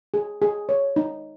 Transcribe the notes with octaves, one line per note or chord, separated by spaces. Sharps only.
G#4
G#4
C#5
D#4